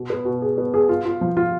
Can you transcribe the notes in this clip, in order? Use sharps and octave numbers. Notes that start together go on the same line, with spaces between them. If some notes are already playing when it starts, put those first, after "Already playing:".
Already playing: B2
B3
B2
G#4
B3
G#4
F4
F4
F3
F4